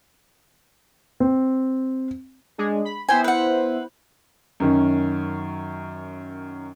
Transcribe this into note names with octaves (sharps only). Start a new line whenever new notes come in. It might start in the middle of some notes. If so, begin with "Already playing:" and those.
C4
G#3 D4 G#4
B5
B3 E4 C5 G5 G#5
B4 F#5
F#2 D#3 C#4